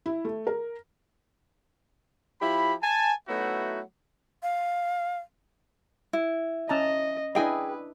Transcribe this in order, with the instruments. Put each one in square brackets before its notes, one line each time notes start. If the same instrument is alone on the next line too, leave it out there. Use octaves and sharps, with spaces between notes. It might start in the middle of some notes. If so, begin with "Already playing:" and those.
[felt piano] E4
A3
A#4
[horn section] F3 E4 G4 B5
G#5 A5
F#3 A3 B3 D#4 E4 F#4
[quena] F5
[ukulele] E4
[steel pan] C#4 A5 A#5 [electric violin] D#5
[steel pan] D4 E4 D#5 [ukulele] G#4 G5 G#5 [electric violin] B4